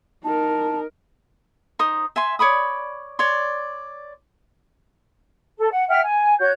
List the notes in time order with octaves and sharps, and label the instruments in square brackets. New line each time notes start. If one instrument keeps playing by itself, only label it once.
[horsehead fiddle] D#4 A#4 [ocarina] A5
[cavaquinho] D#4 C5 D#6
E5 G#5 C6
C#5 D5 B5 D#6
C#5 D5 C6
[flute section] A4
F#5
E5 F#5 G5 F6
G#5
F#4 C#5 G6